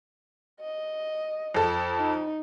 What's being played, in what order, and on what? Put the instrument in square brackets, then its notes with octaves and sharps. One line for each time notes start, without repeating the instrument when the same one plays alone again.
[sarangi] D#5
[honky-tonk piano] F2 A4
[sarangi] D#4